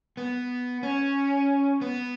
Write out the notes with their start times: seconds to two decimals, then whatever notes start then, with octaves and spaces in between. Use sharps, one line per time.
0.17 B3
0.83 C#4
1.81 B3